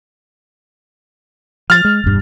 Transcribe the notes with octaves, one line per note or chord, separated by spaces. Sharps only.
F3 F6 A6
G#3
E1 G2